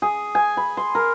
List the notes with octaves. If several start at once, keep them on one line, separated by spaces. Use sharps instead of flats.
G#4
G#5
B5
C6
A#4